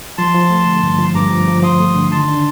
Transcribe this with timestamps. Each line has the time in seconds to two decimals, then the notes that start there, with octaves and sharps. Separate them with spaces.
0.18 F3 A5 C6
0.34 F3
0.50 A3
0.66 D3
0.83 G2
0.98 F3
1.15 G2 A#5 D6
1.31 F3
1.48 F3
1.63 F3 C6 D#6
1.80 A3
1.95 D3
2.11 D#3 A5 C6
2.28 D4